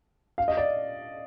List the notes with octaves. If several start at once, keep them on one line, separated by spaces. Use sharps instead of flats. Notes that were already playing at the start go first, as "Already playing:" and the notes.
F5
D#5
D5